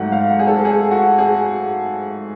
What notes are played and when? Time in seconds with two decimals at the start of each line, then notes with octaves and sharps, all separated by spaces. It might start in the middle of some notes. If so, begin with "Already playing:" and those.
Already playing: G#2 F#3 A3 F#5
0.12 F5
0.29 F#5
0.39 G#4
0.47 A4
0.65 G#4
0.91 F#4
1.19 G#4